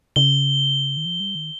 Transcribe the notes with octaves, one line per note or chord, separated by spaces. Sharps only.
C#3 G7
D#3
F3
G3
D#3